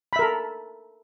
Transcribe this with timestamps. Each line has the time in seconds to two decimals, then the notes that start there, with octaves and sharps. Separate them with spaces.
0.13 B5
0.16 E5
0.19 A#4
0.22 A4